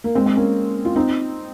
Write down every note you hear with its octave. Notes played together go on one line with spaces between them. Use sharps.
A#3
G#3 C4
C4
A#3 C#4
F4
C4 D#4